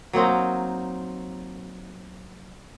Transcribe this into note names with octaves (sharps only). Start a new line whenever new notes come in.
F#3 A#3 C4 D#4